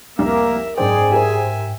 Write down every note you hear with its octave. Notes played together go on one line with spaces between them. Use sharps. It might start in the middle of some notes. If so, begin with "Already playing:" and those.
F1 C2 A#3 A#4 E5
F#1 G#2 G#4 C5 D5 G5
G4 A#4 C5 E5 G#5